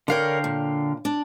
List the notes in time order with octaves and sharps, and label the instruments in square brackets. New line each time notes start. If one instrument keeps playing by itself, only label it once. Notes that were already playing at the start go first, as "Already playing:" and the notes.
[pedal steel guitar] D3 F5 G5 [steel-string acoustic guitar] D4 A#4 C#5
[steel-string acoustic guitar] A#2
D4